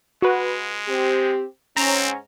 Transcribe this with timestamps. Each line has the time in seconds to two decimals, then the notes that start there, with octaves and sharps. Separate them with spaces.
0.22 G#3 F#4 B4
0.87 C4 G4
1.77 G#2 C4 C#4 A#5